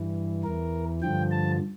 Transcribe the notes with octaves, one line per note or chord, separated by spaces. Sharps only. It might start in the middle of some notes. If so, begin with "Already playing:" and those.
Already playing: G2 E3
E2 E3 A#4
G2 D3 F3 G5
A5